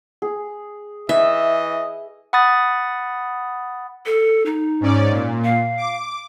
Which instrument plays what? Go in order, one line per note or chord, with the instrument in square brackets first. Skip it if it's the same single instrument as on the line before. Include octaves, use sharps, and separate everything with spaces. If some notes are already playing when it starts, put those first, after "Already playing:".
[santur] G#4
[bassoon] E3 [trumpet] D#5 [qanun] E5
[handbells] F#5 B5 D#6 A6
[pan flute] A4
D#4
[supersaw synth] G#2 C#4 D5
A#2
[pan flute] F5
[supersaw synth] D6